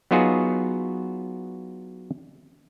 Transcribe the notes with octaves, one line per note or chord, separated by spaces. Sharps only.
F#3 B3 D#4 F4 F#4 G#4